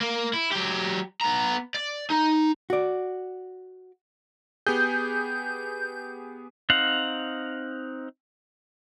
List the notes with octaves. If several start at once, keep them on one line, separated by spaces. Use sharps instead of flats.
A#3
E4
F#3 G4
B3 A#5
D5
D#4
F#4 D5
B3 G4 G#4 G6
C4 D#4 F5 F#5